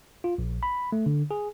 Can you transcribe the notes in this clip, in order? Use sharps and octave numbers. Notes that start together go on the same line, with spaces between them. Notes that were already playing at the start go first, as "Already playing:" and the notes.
F4
A#1
B5
A3
D3
G#4